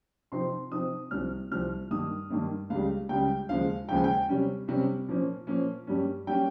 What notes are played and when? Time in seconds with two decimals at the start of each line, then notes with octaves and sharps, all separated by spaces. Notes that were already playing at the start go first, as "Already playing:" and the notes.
0.32 C3 F3 C4 D#4 C6
0.71 C3 F3 C4 D#4 D#6
1.11 C2 C3 F3 F6
1.51 C2 C3 F3 F6
1.91 G2 D#3 A#3 D#6
2.30 G2 D#3 A#3
2.70 C#2 C#3 G3 F5
3.09 C#2 C#3 G3 G5
3.49 D#2 C#3 F3 G#3 F5
3.88 D#2 C#3 F3 G#3 G5
3.96 G#5
4.04 G5
4.29 C3 G3 C#4
4.68 C3 G3 C#4
5.08 A#2 F3 A#3 C#4
5.47 A#2 F3 A#3 C#4
5.87 G2 G3 A#3 C#4
6.27 G3 A#3 C#4 G5